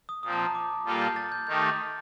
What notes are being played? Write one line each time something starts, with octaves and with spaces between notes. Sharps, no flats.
D#6
A#2 F3 C4 D#6
A5
A#5
D6
A#2 G3 A#3 F4 A4 F6
G6
A6
G6
D#3 A3 D#4 G4 G6
A6